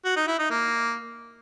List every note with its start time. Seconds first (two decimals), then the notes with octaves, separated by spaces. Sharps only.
0.05 F#4
0.16 D#4
0.28 E4
0.39 D#4
0.50 A#3